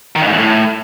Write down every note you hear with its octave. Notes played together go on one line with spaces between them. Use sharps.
D#3
G2
G#2
E2
A2